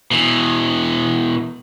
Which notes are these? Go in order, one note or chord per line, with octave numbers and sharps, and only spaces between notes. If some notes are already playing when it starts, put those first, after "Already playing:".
B2 E3